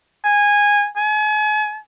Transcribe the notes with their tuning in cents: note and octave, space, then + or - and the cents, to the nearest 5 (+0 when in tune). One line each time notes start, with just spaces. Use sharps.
G#5 -15
G#5 +40